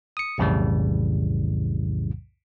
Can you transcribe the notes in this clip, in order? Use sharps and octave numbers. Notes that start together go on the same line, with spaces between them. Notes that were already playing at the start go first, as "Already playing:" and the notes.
D#6 C#7
B1 F2 A2 C#3 E3 G3